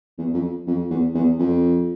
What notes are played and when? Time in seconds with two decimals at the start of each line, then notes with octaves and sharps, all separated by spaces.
0.18 E2
0.34 F2
0.67 F2
0.90 E2
1.15 E2
1.39 F2